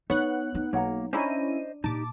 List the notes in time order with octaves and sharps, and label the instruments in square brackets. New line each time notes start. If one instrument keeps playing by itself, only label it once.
[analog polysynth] B3 F#5 F#6 [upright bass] D#4 [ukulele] C#5
[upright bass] D#4
[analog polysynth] B1 [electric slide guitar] A#3 [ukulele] C#5 F#5 A#5
[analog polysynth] C#4 E4 D#7 [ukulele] D4 A#5 [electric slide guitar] C5 D#5
[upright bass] A#2 [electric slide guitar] D#4 G4 [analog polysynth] A5 D6